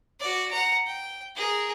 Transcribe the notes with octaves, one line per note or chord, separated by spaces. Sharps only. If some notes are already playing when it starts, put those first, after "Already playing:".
F#4 D5
F#5 A#5
G5
G#4 A#4